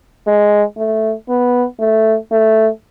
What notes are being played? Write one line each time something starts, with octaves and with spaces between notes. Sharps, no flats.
G#3
A3
B3
A3
A3